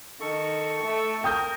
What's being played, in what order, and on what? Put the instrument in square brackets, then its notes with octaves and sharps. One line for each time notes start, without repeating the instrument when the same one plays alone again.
[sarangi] D#3 [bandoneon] A4 C#6
[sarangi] A3
[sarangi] A#4 [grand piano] G5 D#6 G6